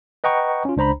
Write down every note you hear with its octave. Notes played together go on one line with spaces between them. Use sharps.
B4 D#5 F#5 G5 A#5 C#6
C#4 F4
C#2 D4 C5 A#5 B5